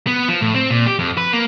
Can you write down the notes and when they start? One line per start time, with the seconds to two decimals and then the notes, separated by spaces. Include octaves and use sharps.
0.07 B3
0.28 F3
0.41 A2
0.54 C4
0.70 A#2
0.86 G4
0.99 F2
1.17 B4
1.33 A#3